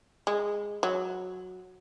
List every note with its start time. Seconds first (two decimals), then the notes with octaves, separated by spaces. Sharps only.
0.27 G#3
0.83 F#3